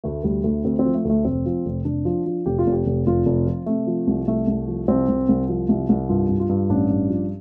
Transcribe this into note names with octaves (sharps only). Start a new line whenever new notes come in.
D2 A3
D2 G3
D2 A3
D2 C4
C4
F3
A3
D2 A3
F1 C4
F3
F1
F1 D4
F3
F3
F1 G4
F4
F1
G4
F1
F1 F4
F1
F3
C3 A3
F3
C2
C2 A3
C2
F3
C2 C4
C2
C2
F3
C2
C2
G2 F4
G2
F4
G2
A1 D4
G2
F3